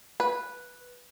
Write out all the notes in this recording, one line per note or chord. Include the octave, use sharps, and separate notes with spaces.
B4